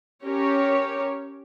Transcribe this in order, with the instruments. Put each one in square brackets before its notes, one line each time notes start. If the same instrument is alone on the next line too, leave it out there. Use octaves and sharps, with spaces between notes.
[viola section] C#4 G4 A#4 C#5